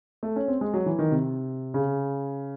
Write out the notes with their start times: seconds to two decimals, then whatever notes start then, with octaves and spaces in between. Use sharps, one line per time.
0.23 A3
0.36 C#4
0.48 C4
0.61 G#3
0.74 F#3
0.86 E3
0.99 D#3
1.11 C3
1.74 C#3